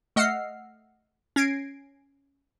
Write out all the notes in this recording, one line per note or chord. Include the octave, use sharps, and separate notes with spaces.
A3 D#5 F#5 E6 F6 C7
C#4 G#6 A#6 C7 D7